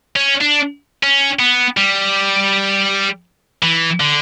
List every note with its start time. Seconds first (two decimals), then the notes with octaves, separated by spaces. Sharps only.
0.16 C#4
0.41 D4
1.03 C#4
1.39 B3
1.77 G3
3.63 E3
4.00 D3